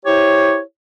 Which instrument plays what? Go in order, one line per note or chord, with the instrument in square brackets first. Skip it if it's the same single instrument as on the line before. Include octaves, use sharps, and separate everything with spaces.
[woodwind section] E4 G4 C5 C#5